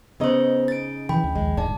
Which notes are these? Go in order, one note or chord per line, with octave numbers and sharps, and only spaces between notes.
C#3 B3 D#4 C5 D#5
A6 D7
D#3 E3 G5 B5
D2
A#1 D#2 G#3
D#1 D2 G#2 D5 A5